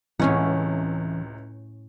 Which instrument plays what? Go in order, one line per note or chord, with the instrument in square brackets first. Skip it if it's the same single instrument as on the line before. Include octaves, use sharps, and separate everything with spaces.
[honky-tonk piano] C#2 C3 [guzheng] A2 C#4 F#5 [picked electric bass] E3